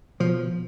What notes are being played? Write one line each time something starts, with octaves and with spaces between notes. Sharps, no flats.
B2 F3